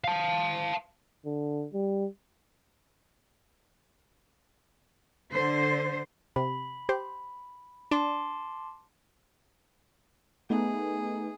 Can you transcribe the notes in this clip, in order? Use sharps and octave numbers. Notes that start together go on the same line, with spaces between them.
F5 A5
D3
G3
D3 C5
C3 B5
G4 C5
D4 A5 C6 D6
A3 B3 D#4 G#4